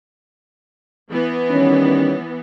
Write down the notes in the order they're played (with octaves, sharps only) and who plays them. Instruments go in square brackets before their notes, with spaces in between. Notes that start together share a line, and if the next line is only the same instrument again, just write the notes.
[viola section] E3 B3
[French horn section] D#3 G3 C#4